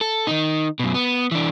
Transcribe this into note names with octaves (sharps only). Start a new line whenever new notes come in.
A4
D#3 D#4
F#2 B2
B3
E3 D4